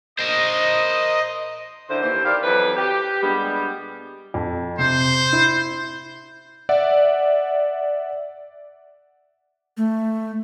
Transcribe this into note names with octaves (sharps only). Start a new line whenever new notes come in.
A#4 C5 D#5
F#2 D3 E4 C5
D#2 E3 C5
E4 G4 A#4 C5 D5 F5
F2 E3 F#3 G4 B4
G4
A#2 G3 G#3 B3 D4
F2
C3 C5
E4
D5 E5 F#5
A3